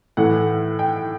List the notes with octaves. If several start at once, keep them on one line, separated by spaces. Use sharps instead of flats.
A2 E3 A3 F#5
G5